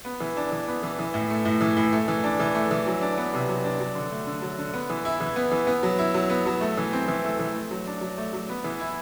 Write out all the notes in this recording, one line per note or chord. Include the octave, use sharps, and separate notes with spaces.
B3
E3
D4
E3
B3
E3
E3
A2
A3
A2
E3
A2
A3
E3
D4
E3
A3
E3
F#3
D4
B3
C3
F#3
D4
F#3
D3
A3
D3
F#3
D3
B3
E3
E4
E3
B3
E3
B3
F#3
E4
F#3
B3
F#3
A3
E3
C4
E3
A3
E3
A3
F#3
D4
F#3
A3
F#3
B3
E3
E4